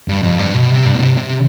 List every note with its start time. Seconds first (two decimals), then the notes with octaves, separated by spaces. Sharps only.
0.08 G2
0.23 F2
0.39 G2
0.54 B2
0.70 C3
0.86 G2
0.95 B2
1.02 C3
1.17 C3